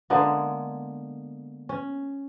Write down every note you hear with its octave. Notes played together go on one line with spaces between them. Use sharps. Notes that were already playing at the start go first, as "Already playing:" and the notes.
D3 G#3 A#3 B3
C#4